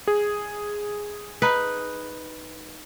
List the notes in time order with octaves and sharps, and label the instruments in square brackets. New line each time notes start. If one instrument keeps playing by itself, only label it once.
[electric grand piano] G#4
[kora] D#4 B4